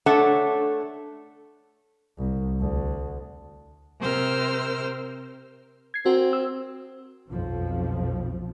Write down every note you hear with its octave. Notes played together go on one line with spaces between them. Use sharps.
A3 D4 A4 C#5 F#5 A5
C2
D2
C3 A#4 C5 E6 F6
G#6 C7
C4 F#4 A#4
E6
B1 F2 F3